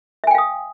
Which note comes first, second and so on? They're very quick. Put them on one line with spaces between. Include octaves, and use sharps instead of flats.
E5 G#5 G5 F5 D#6